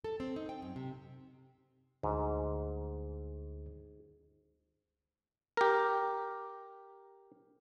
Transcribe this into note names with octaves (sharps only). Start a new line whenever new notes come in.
A4
C4
D#4
G5
F#2
C3
D2 G#2
G4 A#4